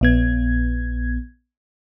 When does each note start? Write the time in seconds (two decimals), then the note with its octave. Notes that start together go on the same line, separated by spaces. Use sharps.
0.01 A#1 B3 G#6